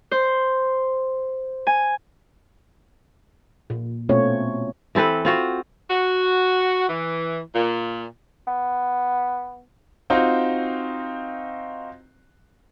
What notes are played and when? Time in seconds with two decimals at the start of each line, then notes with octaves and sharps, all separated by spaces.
0.11 C5
1.67 G#5
3.70 A#2
4.09 B2 A3 C4 C#4 F4 C#5
4.95 E3 C4 A4 B4
5.25 C4 F4 F#4
5.90 F#4
6.88 E3
7.55 A#2
8.48 B3
10.10 C4 D#4 F4 F#4